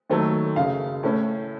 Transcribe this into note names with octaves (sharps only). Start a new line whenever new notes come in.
D#2 D#3 F#3 A3
F#1 F#2 C#3 F5
A2 A3 C#4